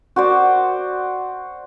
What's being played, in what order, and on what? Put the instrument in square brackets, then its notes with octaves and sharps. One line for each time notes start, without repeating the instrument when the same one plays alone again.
[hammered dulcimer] F#4 C5 D5